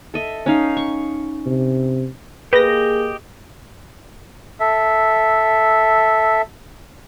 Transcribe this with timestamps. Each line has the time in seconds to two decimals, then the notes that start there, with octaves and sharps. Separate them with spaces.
0.14 A4 D#5 E5
0.46 C#4 D#4 F5
0.77 C#6
1.46 C3
2.53 A#3 G4 G#4 B4 D#5 A#6
4.60 A4 E5